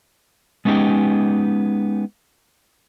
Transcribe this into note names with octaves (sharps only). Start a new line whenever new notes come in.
G#3 B3 C#4 D#4 G4